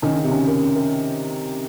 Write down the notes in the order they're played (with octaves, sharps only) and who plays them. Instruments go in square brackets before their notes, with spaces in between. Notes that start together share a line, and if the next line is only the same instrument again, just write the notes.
[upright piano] D#3 [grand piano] C#4
[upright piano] C#3 [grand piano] C#4
[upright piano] C3
[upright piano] C#3 [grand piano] C#4
[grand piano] A#4
C#4
A#4